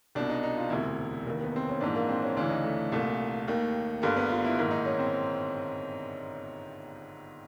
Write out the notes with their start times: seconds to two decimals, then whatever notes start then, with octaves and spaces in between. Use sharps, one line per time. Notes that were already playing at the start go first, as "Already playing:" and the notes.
0.15 C2 B2 D4
0.30 D#4
0.43 D#4
0.57 F4
0.70 E1 D2 C3 E4
1.26 F1 D#2 D#3
1.43 B3
1.56 C4
1.69 C#4
1.81 A#1 G#2 E3 D4
1.96 A#3
2.09 C4
2.22 C#4
2.37 D2 C#3 E3 D4
2.50 D#4
2.64 A3
2.92 C2 A#2 A3
3.48 D#2 D#3
4.02 G1 G2 D3 A#3
4.17 B3
4.30 F4
4.44 E4
4.57 A#1 G#2 D#3 E4
4.71 D#4
4.85 C#4
4.99 C4